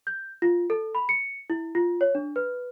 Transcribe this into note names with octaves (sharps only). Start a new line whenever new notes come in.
G6
F4
A4
B5
C#7
E4
F4
C#5
D4
B4